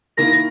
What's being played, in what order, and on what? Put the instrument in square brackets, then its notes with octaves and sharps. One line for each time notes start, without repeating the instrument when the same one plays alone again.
[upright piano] D#3 A#3 E4 A#4 [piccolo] A#6